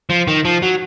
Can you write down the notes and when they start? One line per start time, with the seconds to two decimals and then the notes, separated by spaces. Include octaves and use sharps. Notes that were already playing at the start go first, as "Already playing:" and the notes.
0.10 F3
0.27 D#3
0.45 F3
0.62 F#3